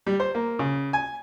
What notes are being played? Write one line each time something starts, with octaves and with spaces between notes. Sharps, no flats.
G3
C5
A#3
C#3
G#5